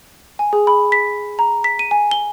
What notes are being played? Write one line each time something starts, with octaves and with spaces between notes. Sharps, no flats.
G#5
G#4
B5
B6
A#5
B6
D#7
G#5
G7